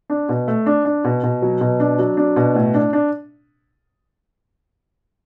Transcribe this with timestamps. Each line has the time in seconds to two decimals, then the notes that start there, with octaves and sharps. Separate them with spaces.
0.10 D4
0.29 B2
0.48 A3
0.66 D4
0.85 D4
1.04 B2
1.23 B2
1.42 F#3
1.61 B2
1.80 D4
1.99 F#3
2.17 D4
2.36 B2
2.55 A2
2.74 D4
2.93 D4